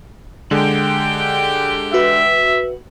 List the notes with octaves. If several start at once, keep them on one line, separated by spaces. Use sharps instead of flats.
D3 G#3 G4 G5
F#4 B4 E5